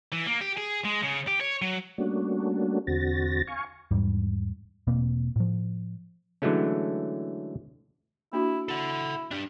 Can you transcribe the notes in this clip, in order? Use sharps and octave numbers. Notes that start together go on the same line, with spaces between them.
E3
A#3
G4
G#4
G#3
C#3
G4
C#5
F#3
G3 A3 A#3 C#4 D4 F#4
E2 D3 C4 F#4 A6 A#6
F5 G#5 C#6
E2 G#2 G3
E1 B2 A#3 C4
A2 F3
D3 E3 F#3 G#3 A3 C#4
A#3 D4 E4 F#4
E4 A4 F#5
D4 G4